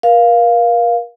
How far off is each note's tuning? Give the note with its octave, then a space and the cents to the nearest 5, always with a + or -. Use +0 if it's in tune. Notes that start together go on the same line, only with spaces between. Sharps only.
A#4 +35 F5 +0